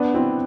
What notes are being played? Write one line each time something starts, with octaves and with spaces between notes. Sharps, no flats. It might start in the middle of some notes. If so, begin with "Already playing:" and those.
Already playing: B3 D4
C4 E4